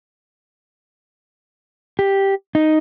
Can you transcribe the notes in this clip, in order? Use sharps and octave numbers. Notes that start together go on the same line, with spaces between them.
G4
D#4